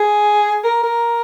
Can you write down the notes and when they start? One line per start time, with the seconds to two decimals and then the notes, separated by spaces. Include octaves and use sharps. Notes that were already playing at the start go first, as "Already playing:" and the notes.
Already playing: G#4
0.64 A#4
0.83 A#4